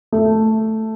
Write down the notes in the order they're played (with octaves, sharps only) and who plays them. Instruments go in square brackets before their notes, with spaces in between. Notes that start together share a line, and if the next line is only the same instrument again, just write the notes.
[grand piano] A3